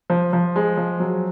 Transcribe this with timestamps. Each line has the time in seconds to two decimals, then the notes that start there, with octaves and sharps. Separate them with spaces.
0.10 F3
0.33 F3
0.56 G#3
0.77 F3
1.00 F#3